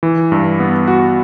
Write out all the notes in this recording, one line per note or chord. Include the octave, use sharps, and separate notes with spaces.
E3
G2
B3
F#4